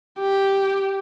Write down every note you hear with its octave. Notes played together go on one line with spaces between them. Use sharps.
G4